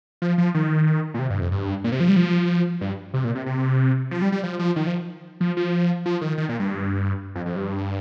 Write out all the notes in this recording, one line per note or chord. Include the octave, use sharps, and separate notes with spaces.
F3
F3
D#3
A#2
C3
G2
F2
G2
A#2
C3
F3
G3
F3
G2
C3
A#2
C3
C3
F3
G3
G3
F3
F3
D#3
F3
F3
F3
F3
D#3
D#3
A#2
G2
F2
F2
G2